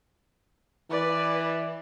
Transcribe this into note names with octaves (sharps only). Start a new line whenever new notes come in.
E3 B4 D5